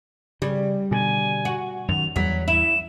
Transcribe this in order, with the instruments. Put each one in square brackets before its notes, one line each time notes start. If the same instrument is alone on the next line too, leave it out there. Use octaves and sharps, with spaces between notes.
[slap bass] C#3 [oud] G3
[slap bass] B2 D3 [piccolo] G#5
[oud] F#4
[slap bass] F#2 D#3 [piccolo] F7
[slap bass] E2 G3 [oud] F#3 [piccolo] B6
[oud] E4 [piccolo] E7